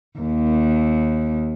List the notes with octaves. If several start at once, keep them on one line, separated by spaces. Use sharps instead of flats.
D#2